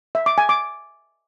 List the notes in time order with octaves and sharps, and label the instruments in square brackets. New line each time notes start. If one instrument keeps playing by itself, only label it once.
[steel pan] E5
D6
G#5
D6